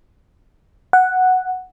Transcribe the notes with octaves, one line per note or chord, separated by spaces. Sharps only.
F#5